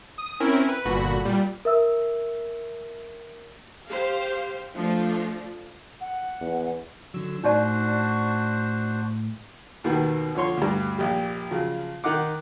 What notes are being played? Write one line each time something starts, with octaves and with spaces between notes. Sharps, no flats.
D#6
C4 C#4 E4 A#4
B4
G1 A#2 D3 F#4 B5
A#2 G3
A#4 E5 E6
G4 C5 F5
F3 A3 D4
F#5
E2
D3 F#3 E6
A2 D4 D#4 F#4 C5 D5
D#2 B2 D#3 B3
D3 F3 C#5 C6
D2 G2
A#1 G4
C#3 F3 F#3
D#3 D#4 F#5 D6